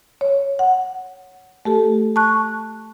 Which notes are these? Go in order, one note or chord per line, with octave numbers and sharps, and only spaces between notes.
C#5
F#5
A3 G4 A4
A5 C#6 F#6